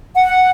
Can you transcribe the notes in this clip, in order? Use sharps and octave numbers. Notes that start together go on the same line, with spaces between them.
F#5